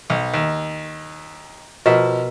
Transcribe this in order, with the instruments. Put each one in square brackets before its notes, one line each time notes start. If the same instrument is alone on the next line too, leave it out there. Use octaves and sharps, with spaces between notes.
[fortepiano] B1
D#2
[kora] B2 A#4 E5 [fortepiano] F3